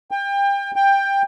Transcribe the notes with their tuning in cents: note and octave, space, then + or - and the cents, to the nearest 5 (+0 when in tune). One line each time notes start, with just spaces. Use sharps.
G5 +30
G5 +15